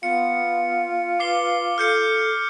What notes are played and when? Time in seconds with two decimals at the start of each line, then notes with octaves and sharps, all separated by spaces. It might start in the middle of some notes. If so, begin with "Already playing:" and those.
0.03 B3 F4 C#7
1.20 B4 D6 C7 G7
1.78 A4 F6 G6 C#7